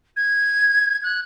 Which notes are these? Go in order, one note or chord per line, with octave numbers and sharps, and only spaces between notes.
G#6
F#6